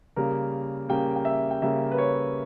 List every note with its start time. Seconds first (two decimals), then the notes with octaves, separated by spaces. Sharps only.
0.16 C#3 G3 A#3 A#4
0.89 C#3 G3 A#3 G5
1.16 G5
1.25 E5
1.51 G5
1.62 C#3 G3 A#3 E5
1.91 B4
1.98 C#5